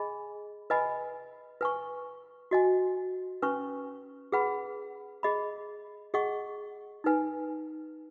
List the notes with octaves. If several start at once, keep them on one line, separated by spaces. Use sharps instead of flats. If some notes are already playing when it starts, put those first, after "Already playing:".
Already playing: G#4 D#5 G#5 B5
B4 D#5 G#5 B5
B4 G#5 C#6
F#4 D#5 G#5
C#4 B4 G#5 C#6
G#4 B4 F#5 B5
G#4 D#5 B5
G#4 D#5 F#5 C#6
D#4 B4 G#5